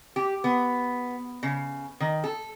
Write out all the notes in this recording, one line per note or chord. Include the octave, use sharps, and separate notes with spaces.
G4
B3
C#3
D#3
A4